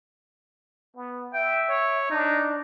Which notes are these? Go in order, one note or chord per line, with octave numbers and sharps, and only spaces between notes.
B3
E5 G5
C#5
D4 D#4